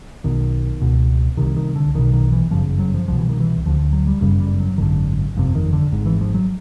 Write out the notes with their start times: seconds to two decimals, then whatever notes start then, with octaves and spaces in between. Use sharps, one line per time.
0.24 B1 B2 D#3
0.82 C#2 B2
1.37 C2 C3 D#3
1.56 D#3
1.76 D3
1.95 B1 B2 D#3
2.13 D#3
2.32 E3
2.51 G1 F#2 C#3 F3
2.79 F#3
2.94 F3
3.08 C2 B2 F3
3.19 E3
3.29 D#3
3.40 E3
3.65 D2 D3 F3
3.93 F#3
4.07 G3
4.21 G1 F#2 C#3 G3
4.40 G3
4.60 F#3
4.78 G#1 F#2 D3 D#3
5.35 G1 F2 C3
5.55 D#3
5.73 D3
5.92 G#1 G#2
6.06 E3
6.21 F3
6.35 F#3